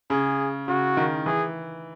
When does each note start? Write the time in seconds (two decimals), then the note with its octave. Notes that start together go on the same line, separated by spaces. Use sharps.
0.10 C#3 G#4
0.68 C#3 F#4
0.97 D#3
1.26 E3 G#4